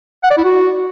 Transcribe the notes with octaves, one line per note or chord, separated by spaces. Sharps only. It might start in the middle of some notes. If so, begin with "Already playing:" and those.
F#5
D5
E4
F#4